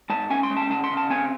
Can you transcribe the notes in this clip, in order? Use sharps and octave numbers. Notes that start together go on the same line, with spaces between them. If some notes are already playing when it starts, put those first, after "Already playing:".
G#2 A5
C#4 G#5
C6
G#3
A5
C#3 A5
C6
C#3
A5
C4 G#5